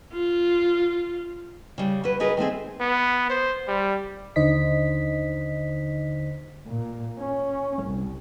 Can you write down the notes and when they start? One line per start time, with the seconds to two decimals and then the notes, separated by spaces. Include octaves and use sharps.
0.13 F4
1.78 C#3 G3
2.04 F#3 B4
2.20 C#4 D#4 F#4 G#4 A#4 B4
2.37 D#3 A3 C4 G#4
2.80 B3
3.30 C5
3.68 G3
4.36 D#2 D3 D#4 C5 D#5 B6
6.67 A#2
7.20 C#4
7.83 C2